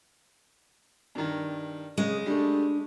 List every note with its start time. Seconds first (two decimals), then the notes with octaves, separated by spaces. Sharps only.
1.15 G2 D#3
1.98 C#3 G#3 G#4
2.26 G3 A3 D4